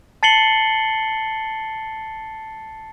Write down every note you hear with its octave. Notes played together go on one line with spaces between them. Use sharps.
A5 A6 C7 C#7 F#7 G7